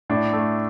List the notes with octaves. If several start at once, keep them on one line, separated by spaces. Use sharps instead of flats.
A2 D4
A3